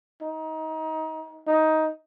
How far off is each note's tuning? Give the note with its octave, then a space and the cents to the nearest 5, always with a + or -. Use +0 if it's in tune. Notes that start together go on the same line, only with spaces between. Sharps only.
D#4 +25
D#4 +15